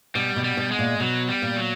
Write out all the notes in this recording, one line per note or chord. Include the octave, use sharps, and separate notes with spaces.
B2 G3
B2
G3
B2
G#3
A#2
B2 F#3
G3
A#2
F#3